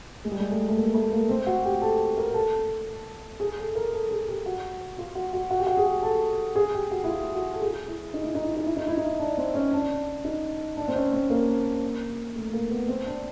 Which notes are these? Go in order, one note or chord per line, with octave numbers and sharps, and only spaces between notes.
G#3
G3
G#3
A3
A3
A#3
A3
A#3
C4
F#4
G4
A4
A#4
A#4
A4
G#4
A4
A#4
A4
G#4
G4
F#4
F4
F#4
F#4
F#4
G4
F#4
G#4
A4
G#4
G4
F#4
E4
F4
F#4
A4
G#4
E4
D#4
E4
D#4
E4
D#4
E4
D#4
E4
D#4
D4
C4
C#4
D4
D#4
D4
C4
C#4
C4
A#3
A3
A#3
B3
C4
D4